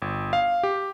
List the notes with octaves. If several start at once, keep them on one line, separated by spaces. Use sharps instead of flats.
G1
F5
G4